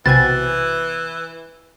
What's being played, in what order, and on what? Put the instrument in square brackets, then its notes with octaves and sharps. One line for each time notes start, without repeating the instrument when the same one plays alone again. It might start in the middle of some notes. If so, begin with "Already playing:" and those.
[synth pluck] B1 C3 G#5 [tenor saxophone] E3 [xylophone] A6